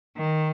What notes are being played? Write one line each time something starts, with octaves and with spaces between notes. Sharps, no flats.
D#3